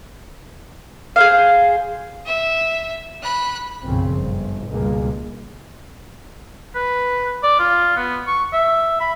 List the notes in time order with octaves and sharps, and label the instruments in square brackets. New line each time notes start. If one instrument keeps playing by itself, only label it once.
[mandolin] G#4 C5 F5
[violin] E5
B5 F#6
[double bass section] B1 F#2 A#2 C#3 F3 C4
G1
C#2 G2 B2 G3 G#3 A#3
[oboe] B4
D5
F4
B3
C#6
E5
B5